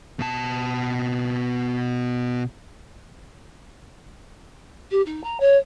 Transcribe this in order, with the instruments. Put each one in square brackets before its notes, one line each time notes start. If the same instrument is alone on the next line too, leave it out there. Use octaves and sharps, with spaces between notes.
[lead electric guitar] B2 A5
[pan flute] G4
D#4
A#5
C#5